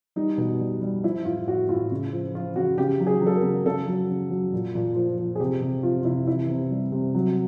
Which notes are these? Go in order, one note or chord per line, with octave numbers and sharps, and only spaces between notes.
G3 D#4
B2
G3
G3
F3 E4
A2 F4
A2 F#4
A2 F4
C#3
F3
F3 F4
C#3 F#4
C#3 G4
F#3
G#4
F#3 A4
A#4
C#3
C#3 A4
F#3
C#3
F#3
A#2
A#2
F3
F3
G#4
C3 G4
C3
F3 F4
F4
C3 E4
E3 E4
C3
G3
C3
F#3